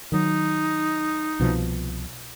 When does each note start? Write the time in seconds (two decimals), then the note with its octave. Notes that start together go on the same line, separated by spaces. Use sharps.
0.12 D#3 F#3 D#4
1.39 C2 B2 F3